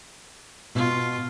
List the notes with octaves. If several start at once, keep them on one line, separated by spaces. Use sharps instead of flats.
B2 F4